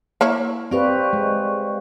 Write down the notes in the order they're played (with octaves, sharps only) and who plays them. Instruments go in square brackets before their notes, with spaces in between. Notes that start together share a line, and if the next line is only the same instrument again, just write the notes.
[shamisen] A#3 E4 C#5
[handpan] C4 G4 B4 [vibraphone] D5 F5 C#6
[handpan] G#3